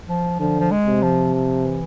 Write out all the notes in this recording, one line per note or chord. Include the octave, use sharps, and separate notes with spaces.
F3
D3 F3
F3
G#3
C3
F3
F3
E3